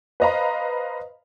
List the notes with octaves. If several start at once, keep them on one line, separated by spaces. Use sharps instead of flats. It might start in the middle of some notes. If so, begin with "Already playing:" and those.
B4 C5 D#5 F5 A#5 B5